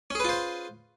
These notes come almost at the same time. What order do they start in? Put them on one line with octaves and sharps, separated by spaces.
C#4 G#4 B4 F4 C5